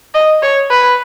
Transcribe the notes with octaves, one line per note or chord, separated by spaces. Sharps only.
D#5
C#5
B4